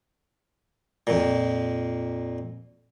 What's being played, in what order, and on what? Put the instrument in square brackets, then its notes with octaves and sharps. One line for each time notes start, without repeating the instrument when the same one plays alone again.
[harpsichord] F2 A#2